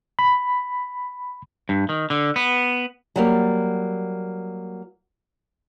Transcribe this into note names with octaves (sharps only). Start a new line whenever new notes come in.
B5
G2
D#3
D3
B3
F#3 G3 A#3